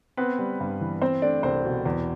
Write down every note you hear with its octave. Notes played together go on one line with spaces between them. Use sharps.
B3 C4 B4
G3
G2
E3
C4 C5
A3 D4 D5
C2 C4 C5
B2
E2